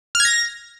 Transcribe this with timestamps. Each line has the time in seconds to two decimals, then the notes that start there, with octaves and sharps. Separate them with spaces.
0.15 F6
0.20 G#6
0.25 A#6